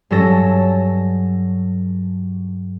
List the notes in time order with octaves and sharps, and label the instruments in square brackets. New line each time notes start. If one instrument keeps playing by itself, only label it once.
[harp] G2 F#3 C#4 A4 A#6